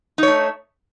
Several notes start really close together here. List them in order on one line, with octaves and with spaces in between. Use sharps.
D#4 C#5 A3